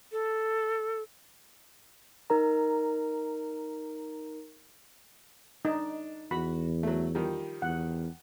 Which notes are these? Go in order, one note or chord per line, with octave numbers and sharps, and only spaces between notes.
A4
D#4 A#4 A#5
D4 D#4
E2 F#4 B5
F#3 A3
D#3 F3 G3
E2 F#5